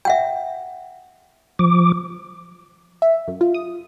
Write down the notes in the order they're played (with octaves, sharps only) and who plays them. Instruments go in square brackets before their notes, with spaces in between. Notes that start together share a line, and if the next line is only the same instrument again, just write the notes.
[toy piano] E5 F#5 G5
[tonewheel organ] F3 D6
[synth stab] E5
F#2
F4
D#6